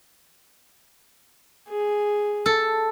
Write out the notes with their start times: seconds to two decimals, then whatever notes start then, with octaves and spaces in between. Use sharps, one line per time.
1.70 G#4
2.46 A4